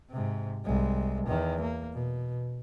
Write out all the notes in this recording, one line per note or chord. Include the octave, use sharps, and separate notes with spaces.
G#2 C3
C2 G#3
E2 D#3
A#3
B2